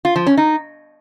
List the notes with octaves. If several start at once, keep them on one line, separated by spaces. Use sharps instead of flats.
F4
F3
C#4
D#4